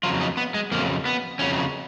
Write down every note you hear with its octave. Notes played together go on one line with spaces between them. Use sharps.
F2 C#3 F#3 F4
D#4
B3
G#3
F2 C#3 F#3 A#3
B3
F2 C#3 F#3 C#4